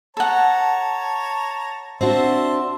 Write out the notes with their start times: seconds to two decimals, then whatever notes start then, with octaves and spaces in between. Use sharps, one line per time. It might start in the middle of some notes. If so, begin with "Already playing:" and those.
0.17 A4 C#5 F#5 A5 A#5
2.01 C4 D4 F#4 E5 A5 C6